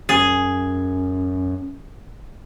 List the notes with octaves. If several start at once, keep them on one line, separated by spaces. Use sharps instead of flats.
F#2 G#4